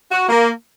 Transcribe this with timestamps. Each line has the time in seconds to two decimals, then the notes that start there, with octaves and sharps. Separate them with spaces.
0.11 F#4
0.29 A#3